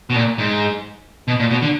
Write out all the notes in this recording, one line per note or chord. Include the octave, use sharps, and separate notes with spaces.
B2
A#2
G#2
B2
A#2
B2
D3